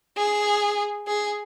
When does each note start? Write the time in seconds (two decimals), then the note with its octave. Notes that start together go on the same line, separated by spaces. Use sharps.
0.17 G#4
1.08 G#4